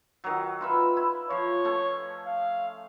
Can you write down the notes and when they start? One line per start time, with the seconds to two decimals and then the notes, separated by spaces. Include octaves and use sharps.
0.24 D#3 F#3
0.61 F4 B4 E5
0.97 E4
1.30 F3 C#5
1.65 A3 C#4
2.26 F5